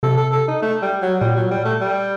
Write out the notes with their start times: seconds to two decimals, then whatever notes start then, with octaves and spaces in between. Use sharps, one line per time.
0.03 C3 A4
0.17 A4
0.33 A4
0.48 D#4
0.62 A3
0.82 G3
1.02 F#3
1.21 A#2 G3
1.36 F#3
1.51 G3
1.65 A3
1.81 G3